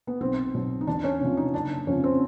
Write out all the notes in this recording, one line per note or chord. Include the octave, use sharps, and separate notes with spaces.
B3
B1 C4
B2 F#3
D#4
E2 D4
C#4
C3 F3
D#4
F#1 D4
F2 C#3 F3 C#4
C4